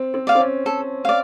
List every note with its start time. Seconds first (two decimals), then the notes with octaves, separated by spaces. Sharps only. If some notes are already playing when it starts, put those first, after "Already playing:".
Already playing: C4
0.14 C4
0.27 D5 F5
0.35 C4
0.40 C#4
0.66 A4
1.05 D5 F5